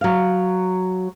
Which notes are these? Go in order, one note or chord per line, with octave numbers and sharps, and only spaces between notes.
F#3 F5